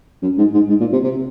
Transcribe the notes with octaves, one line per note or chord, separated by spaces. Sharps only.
F#2
G#2
G#2
G#2
A#2
C3
C3